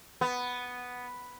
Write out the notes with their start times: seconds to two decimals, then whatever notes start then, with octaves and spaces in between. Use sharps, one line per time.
0.21 B3